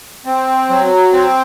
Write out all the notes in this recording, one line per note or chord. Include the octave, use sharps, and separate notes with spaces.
C4
F#3
C4